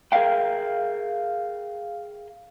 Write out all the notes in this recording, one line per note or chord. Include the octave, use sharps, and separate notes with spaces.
G#4 A#4 D5 E5 F5 G5